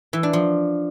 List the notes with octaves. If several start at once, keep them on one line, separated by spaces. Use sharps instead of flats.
E3
D4
F3